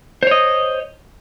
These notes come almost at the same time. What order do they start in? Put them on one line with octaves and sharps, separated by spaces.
C5 C#5 D#5